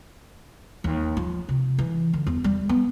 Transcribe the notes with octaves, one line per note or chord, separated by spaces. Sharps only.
D#2
F3
C3
E3
D3
E2
G3
B3